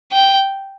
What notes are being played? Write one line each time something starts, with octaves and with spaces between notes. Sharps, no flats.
G5